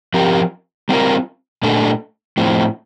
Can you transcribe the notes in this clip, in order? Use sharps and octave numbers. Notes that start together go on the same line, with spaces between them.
F3 C4 G4 A#4
G3 C4 F4 A#4
A#2 A3 D4 A4
A2 F3 C4